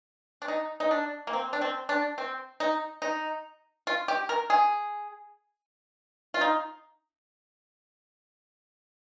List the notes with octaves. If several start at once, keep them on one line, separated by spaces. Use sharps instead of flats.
D4
D#4
D#4
D4
A#3
C4
D4
C4
D4
C4
D#4
D#4
F4
G4
A#4
G#4
F4
D#4